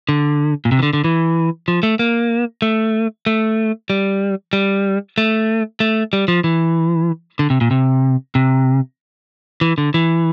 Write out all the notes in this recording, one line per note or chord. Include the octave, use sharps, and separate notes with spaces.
D3
A#2
C3
E3
D3
D3
E3
F3
A3
A#3
A3
A3
G3
G3
A3
A3
G3
F3
E3
D3
C3
A#2
C3
C3
E3
D3
E3